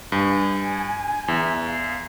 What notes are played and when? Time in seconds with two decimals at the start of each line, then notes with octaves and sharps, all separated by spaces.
0.12 G2 G#5
1.28 E2 E5
1.65 F5